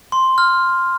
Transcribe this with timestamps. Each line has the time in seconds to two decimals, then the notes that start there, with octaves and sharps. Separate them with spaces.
0.12 C6
0.38 F6